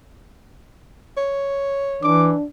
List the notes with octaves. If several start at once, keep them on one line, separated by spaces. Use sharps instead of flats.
C#5
E3 D4 D6